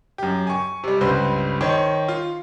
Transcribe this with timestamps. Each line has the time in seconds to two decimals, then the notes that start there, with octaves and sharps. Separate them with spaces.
0.18 F#2 G4
0.47 G#5 C#6
0.84 C3 G3
1.01 C#2 G2 B4 C5
1.61 D#3 C5 C#5
2.08 F4